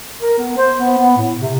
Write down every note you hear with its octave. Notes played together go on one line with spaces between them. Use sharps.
A#4
B3
C5
B3
B3
A2
C3